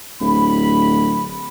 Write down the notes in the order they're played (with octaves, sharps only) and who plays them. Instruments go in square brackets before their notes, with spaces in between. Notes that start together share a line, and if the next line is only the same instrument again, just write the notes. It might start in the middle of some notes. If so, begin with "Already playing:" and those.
[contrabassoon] D1 [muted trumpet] B5